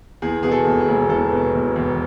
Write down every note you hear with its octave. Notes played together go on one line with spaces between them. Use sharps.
E2 G#4
B2 G#4
A4
E1
G#4
E1
E2 A4
B2
E1
E1